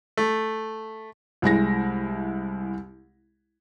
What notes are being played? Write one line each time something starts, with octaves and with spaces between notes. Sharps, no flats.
A3
C2 G#3 E4 A#6